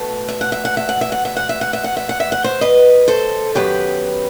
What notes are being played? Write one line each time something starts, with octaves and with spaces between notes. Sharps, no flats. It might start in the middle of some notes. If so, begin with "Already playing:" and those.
Already playing: B2 A3
E5
F#5
E5
F#5
E5
F#5
E5
F#5
E5
F#5
E5
F#5
E5
F#5
E5
F#5
E5
F#5
C5 E5
B4 D#5
A4 C5
F#2 D#3 F#3 B3 G4 B4